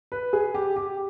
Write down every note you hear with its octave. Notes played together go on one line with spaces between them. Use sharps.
B4
G#4
G4
G4